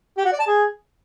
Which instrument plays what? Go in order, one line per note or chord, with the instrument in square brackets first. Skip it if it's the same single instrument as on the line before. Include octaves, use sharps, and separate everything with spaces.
[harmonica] G4
F#4
D5
A5
G#4